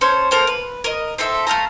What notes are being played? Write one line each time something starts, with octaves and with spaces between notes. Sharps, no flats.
C#4 A4 C5 C#5
A#3 A4 A#4 C5
B4
A#4 D#5
C4 D#4 A4 E5
A3 F5 A5 A#5